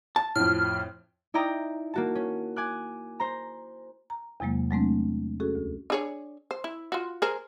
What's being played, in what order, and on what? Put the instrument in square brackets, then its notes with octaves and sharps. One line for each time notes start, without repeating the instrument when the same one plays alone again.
[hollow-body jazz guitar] A5
[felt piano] F2 A2 [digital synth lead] F6
[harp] D#4 E4 D5 G5 A#5 D#6
A#3 F#4 A5
C#4
G#5 D6 F#6
C5 A#5
[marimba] A#5
E2 C3 F#3 G#3 A#3
F#3 G#3 A3 C4 D4
C#4 F#4 G#4 A4
D2
[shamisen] D4 G#4 C#5
C5
E4
F4 F#4
G#4 A#4 C5